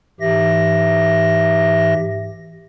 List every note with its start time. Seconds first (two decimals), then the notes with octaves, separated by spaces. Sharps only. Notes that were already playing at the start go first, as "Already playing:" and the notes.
0.20 G#2 E3 G4 E5 A#6